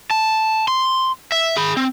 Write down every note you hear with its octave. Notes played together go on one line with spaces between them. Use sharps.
A5
C6
E5
G#4 B5
C4